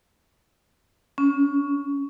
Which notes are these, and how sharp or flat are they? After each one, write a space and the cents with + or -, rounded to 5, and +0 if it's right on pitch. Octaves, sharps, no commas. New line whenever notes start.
C#4 +15